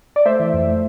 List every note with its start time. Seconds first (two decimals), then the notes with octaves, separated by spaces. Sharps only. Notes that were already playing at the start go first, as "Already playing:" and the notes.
0.16 D5
0.26 A3 C5 E5
0.40 E3
0.53 F2
0.67 A3